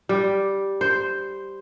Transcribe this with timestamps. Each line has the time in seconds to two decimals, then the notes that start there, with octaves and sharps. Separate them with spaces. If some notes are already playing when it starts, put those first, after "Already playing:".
0.09 G3
0.81 C5